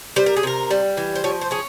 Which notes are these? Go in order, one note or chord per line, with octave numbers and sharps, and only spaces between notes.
G3 C5
A#4
G#4
C3 A#4
G3
E3
C5
F3 C#5
C5
C#4 G#4